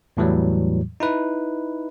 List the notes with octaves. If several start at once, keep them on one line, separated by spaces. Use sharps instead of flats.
E2 A2 E3 F#3 G3
D#4 E4 B4